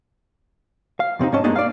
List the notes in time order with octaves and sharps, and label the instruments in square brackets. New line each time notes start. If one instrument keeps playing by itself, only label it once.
[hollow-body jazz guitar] F5
F2 C3 C4 D#4
G#2 C4 C#4 D#5 A5
G2 G#3 A#3 B3 D4 D#4
D5 F5